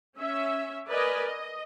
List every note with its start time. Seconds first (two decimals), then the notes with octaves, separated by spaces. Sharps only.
0.17 C#4 E5
0.87 A#4 B4 D5 D#5 G#5
1.24 D#5